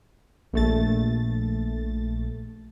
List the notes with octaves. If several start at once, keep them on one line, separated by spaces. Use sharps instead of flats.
A#1 A3 A6